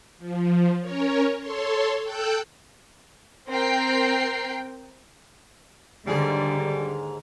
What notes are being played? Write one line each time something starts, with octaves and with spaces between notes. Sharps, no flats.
F3
C#4 A#4 C#5
A4 C#5 C6
A4 G5 E6 F#6 G6
C4 A#4 G5 C7
D#2 G#2 D3 G3 G#4